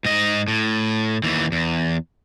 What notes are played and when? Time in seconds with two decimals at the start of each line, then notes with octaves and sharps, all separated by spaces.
0.05 G#2 D#5
0.48 A2
1.24 D#2 E3
1.52 E2